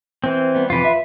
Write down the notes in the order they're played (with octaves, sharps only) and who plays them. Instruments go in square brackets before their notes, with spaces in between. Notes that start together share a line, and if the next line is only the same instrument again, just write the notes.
[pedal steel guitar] E3 C4
[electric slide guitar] G3 B3
[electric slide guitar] F2 C3 E3 [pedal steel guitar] F4 B4
[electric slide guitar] E5